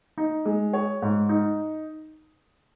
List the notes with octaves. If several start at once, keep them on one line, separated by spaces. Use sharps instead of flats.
D#4
G#3
C#5
G#2
D#4